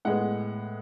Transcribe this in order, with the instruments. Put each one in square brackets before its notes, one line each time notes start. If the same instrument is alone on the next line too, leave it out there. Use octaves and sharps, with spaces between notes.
[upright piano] A2 G#3 B3 F#5